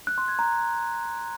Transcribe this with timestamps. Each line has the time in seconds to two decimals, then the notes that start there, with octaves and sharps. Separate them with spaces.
0.07 F#6
0.18 C6
0.28 G#6
0.39 A#5